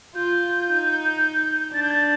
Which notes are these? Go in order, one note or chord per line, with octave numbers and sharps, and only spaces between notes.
F4 G6
D#4
D4 A6
G6
A6